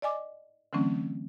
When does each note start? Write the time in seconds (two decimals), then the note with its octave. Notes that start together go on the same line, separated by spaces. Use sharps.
0.02 D5 D#5 G#5 D6
0.73 D3 E3 F#3 A3 C4 C#4